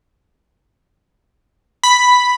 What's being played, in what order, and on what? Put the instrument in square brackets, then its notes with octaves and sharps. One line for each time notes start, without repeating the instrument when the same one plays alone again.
[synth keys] B5